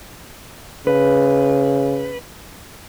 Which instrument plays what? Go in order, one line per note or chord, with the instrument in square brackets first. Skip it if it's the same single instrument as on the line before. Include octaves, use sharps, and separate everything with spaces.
[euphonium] C#3 [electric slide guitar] B4